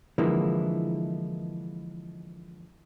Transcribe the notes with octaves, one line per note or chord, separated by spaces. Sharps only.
D3 E3 F3 G#3 A#3 E4